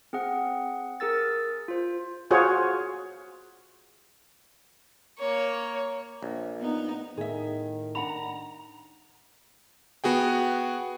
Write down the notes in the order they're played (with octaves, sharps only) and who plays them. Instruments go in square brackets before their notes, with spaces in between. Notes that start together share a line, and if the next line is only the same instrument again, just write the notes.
[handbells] C4 G#4 F#5
G#4 A#4 E6 A6
F4 C5
[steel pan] F4 F#4 G#4 C5 C#5
[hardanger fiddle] A#3 C#5
[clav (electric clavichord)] A#1
[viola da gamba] B3 D#4
[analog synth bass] A2 [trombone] D#3 [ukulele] G#4 E5
[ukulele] D4 F#5 B5 [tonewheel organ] A#5
[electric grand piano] B3 F#4 G#4 G5